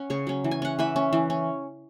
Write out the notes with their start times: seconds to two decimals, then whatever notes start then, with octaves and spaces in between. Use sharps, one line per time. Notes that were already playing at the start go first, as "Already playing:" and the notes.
Already playing: C#4 F#5
0.10 C#3 G#4 C#5
0.27 F#3 C#4
0.44 E3
0.51 G#5
0.62 C#4 F#5
0.79 E3 B4 E5
0.96 C#4
1.13 E3
1.30 C#4